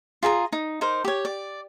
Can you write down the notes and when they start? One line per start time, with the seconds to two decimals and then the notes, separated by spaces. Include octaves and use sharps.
0.23 F4 G#4 A5 A#5
0.53 D#4
0.81 D#4 A#4 C5
1.05 G4 C#5
1.25 D5